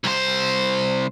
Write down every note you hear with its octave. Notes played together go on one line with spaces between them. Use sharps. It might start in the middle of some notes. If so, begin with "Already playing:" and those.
C2 C5